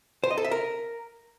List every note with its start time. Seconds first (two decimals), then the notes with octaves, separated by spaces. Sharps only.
0.24 C5
0.31 D#5
0.38 A4
0.45 E5
0.51 A#4